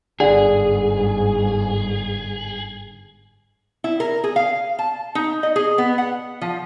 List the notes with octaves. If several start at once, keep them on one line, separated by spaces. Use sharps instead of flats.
G1 G#2 D3 G#4
E4
A#4
G#4
F5
A5
D#4
D#5
G#4
B3
F#5
F3